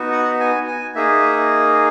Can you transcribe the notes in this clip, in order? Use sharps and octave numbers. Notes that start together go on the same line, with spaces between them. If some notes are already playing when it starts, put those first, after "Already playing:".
Already playing: B3 D#4 F#4
F#5
G#5
G#5
A#3 D#4 G#4 E5